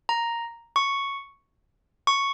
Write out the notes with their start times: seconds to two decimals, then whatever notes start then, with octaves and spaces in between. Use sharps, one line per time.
0.09 A#5
0.76 C#6
2.07 C#6